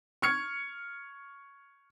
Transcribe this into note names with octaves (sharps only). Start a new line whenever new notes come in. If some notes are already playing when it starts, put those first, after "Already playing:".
C#6 F6 G#6 C#7